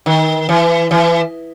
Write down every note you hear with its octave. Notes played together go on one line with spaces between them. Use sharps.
D#3
E3
E3